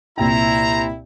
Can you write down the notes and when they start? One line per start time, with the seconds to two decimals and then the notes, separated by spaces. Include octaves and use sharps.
0.18 C2 A#2 E4 C5 G5 A#5